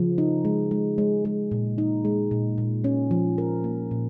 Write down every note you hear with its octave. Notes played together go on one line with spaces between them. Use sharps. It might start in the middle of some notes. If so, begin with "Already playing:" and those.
Already playing: C#3 F3
D#4
G#3
G#3
G#3
G#3
A#2
D#4
G#3
A#2
A#2
C#4
F3
A#4
A#3
A#2